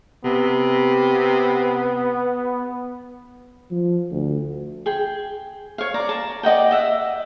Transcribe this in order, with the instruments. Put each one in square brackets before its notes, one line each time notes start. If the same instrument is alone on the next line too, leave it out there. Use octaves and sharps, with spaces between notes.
[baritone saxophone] C3 [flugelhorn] B3
[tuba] F3
D2
[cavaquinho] G#4 G5
C#5 F5
D5 A#5
A5 A#5
D5 D#5 F#5 G5
D#5 E5 F#5